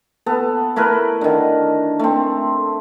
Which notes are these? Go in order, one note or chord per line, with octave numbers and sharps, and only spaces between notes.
B3 A4
A3 E4 A#4 B4
D3 D#3
A3 C4